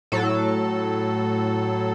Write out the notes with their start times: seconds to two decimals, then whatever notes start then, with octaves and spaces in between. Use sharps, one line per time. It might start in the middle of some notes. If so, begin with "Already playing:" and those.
0.12 A2 F#3 A4